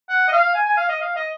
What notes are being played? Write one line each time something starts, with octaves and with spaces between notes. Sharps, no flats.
F#5
D#5
F5
G#5
G#5
F5
D#5
F5
D#5